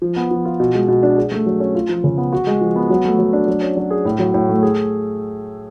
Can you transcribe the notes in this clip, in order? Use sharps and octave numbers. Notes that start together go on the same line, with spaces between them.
F3
B3
F3
F4
B2
G#3
B2
D4
G#4
A3
F#3
C#4
F4
F3
C#3
B3
F#4
G#3
F3
B3
F#3
A3
F#3
D4
F#3
C#4
F#3
G#4
A2
F#3
A2
A3
G#4